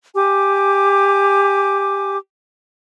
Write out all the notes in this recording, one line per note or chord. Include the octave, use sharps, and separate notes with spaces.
G4 G#5 D6